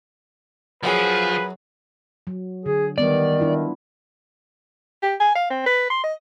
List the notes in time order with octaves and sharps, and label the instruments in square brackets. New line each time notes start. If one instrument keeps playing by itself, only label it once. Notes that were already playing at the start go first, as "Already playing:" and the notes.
[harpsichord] F#2 F#3 F#4 [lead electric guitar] F3 [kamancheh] G#4 [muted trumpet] B4
[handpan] F#3
[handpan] D3 [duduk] G#4
[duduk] D#3 [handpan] G3 B3 [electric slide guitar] D5
[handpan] D4 E4 F4
[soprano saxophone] G4
G#5
F5
C4
B4
C6
D#5